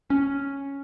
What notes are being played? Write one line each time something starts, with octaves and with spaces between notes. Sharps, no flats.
C#4